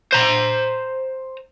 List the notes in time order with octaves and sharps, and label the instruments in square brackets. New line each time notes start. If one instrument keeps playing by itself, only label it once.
[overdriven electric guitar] C5 A#5